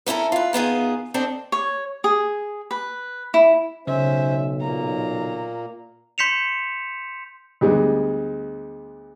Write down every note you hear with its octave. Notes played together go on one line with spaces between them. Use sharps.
B3 C#4 E4 A4 A#4
F4 B4
D#3 B3 F4 G#4
C4 D4 A4 D#5
C#5
G#4
B4
E4
B1 C#3 C#4 C5 E5
A#2 A#3 A#5
C6 G6 B6 C#7 E7 F7
D2 G3 G#3 B3